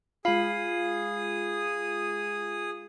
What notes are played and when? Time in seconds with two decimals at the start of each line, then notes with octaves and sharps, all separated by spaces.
0.25 G#3 F4 G#4 F5 B5 D#6